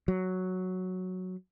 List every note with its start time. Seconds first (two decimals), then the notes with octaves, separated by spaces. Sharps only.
0.08 F#3